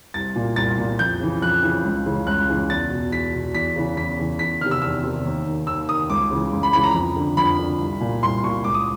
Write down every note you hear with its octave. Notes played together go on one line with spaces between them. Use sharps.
C2 A6
A#2
C2 A6
A#2
F2 G6
C#3 E3
F2 F#6
C#3 E3
C#2
C#3 E3
C#2 F#6
C#3 E3
E2 A6
B2
E2 B6
B2
E2 B6
C#3 E3
E2 B6
C#3 E3
E2 B6
C3 D#3 F6
E6
E2 E6
C3 D#3
D#2
D#3
D#2 E6
D#3 D#6
C#2 D6
C#3 E3
C#2
B5
C#3 E3 B5
A#5
F2
D3
F2 B5
D3
C2
A#2
C2 C6
A#2 C#6
C#2 D6
D#6